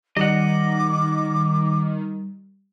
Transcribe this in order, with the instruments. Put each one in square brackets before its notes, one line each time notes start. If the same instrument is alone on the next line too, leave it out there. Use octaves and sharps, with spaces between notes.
[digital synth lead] D#3 [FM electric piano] G3 [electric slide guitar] D#5 F#5 [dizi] D6